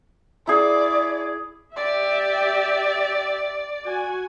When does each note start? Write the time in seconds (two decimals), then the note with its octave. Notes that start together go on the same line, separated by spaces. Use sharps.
0.47 E4 G#4 D5
1.76 G4 D5 E5
3.85 F#4 G#5